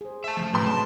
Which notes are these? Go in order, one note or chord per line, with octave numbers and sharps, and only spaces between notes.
G#4 C5
E5 A5
C#3 F3 A3
A2 C3 F#3 B4 C6
G#3 A5